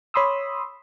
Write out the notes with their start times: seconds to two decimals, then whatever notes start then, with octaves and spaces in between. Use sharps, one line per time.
0.14 C#5 B5 C6 D#6 E6